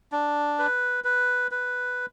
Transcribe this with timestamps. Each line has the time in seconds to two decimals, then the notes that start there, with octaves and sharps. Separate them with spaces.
0.12 D4
0.59 B4
1.04 B4
1.51 B4